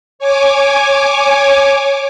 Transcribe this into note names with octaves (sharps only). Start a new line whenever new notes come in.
C#5 G#5 D6